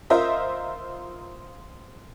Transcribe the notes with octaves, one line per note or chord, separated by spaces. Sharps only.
F4 A#4 C5 D#5 E5